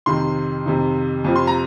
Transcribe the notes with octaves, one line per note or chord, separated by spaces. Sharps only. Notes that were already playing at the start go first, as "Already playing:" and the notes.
F2 C3 D#3 C6
F2 C3 D#3
F2 C3 F3
C6
A#5